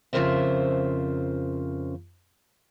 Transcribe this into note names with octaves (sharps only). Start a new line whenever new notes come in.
F2 C#3 F4 A#4 C5 E5